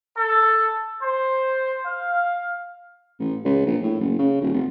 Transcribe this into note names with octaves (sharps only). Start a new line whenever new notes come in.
A4
C5
F5
A1
C#2
A#1
A2
F#1
C#3
D#1
F1